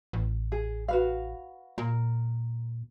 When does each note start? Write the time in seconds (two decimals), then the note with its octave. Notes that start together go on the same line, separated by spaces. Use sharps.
0.13 A1
0.52 G#4
0.88 F#4 B4 F5
1.78 A#2 A#4